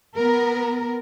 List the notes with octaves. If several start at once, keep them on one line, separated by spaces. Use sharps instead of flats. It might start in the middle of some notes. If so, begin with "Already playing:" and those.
B3 A#4